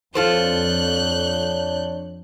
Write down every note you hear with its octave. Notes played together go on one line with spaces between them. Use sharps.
F2 D4 F4 A4 C5 C#5 F#6 G6